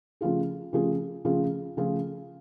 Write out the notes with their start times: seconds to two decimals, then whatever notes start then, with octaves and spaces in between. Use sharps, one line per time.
0.21 C#3 F3 A3 F4 G#4
0.73 C#3 F3 A3 F4 G#4
1.25 C#3 F3 A3 F4 G#4
1.77 C#3 F3 A3 F4 G#4